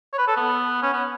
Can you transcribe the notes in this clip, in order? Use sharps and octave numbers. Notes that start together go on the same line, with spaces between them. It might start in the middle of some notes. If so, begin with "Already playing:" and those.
C#5
B4
A4
B3
C#4
B3